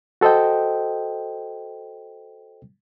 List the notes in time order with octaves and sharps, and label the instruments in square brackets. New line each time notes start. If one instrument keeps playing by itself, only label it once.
[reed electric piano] F#4 A4 C5 D#5 G5